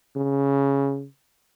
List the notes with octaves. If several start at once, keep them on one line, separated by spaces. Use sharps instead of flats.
C#3